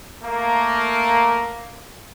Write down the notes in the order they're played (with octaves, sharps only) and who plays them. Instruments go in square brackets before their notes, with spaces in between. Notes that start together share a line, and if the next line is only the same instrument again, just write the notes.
[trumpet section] A3 A#3